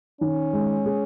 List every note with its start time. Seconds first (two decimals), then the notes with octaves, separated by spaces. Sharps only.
0.21 D#3 C#4
0.53 G#3
0.86 G#4